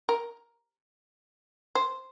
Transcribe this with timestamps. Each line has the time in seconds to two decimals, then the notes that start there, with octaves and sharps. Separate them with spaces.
0.09 A#4
1.75 C5